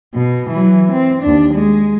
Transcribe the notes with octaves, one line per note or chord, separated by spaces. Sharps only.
B2
E3 F#3
C4
D#2 D4
G#3